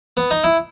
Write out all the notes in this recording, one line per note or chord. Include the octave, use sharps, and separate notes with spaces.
B3
D#4
E4